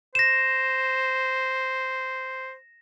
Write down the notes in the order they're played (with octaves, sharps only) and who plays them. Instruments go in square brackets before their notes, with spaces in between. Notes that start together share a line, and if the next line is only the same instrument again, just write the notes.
[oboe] C5 [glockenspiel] A#6 E7